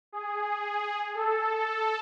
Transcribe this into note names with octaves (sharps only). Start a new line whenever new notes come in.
G#4
A4